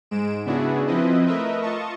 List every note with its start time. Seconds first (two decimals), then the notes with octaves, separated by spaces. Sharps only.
0.11 G#2 G#3 D7 E7
0.45 C#3 B3 D4 E4 F#4 G#4
0.87 F3 C4 E4 B4 D#5
1.27 A3 A#4 B4 D#5 E5
1.61 F4 D#5 A5 C#6